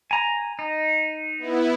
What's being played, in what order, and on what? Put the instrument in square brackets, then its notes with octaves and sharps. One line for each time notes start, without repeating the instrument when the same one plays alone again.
[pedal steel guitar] G#5 A#5
D#4
[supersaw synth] B3 E4